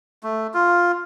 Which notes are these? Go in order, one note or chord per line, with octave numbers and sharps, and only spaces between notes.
A3
F4